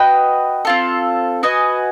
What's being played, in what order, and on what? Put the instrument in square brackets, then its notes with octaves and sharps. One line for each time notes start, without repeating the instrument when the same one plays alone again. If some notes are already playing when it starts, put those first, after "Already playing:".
Already playing: [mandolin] F#4 B4 D#5 G5
C4 F4 A4
F#4 B4 D#5 G#5